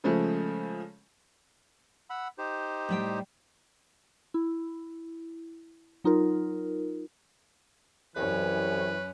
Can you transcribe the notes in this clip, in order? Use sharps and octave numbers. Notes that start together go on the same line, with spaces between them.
C#3 F3 G#3 A3
F#5 B5 E6
D#4 G4 C5
A2 G3 G5
E4
F#3 D#4 F4 A#4
C2 F#2 E3 C#4 B4